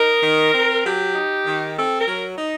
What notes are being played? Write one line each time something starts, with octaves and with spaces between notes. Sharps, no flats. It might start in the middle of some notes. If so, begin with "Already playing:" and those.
Already playing: D#4 A#4
D#3
C4
F#3 G4
D#4
D#3
C4 A4
A#4
F#3
D#4